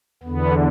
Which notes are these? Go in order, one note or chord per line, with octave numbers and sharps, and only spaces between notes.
E2 B3
D3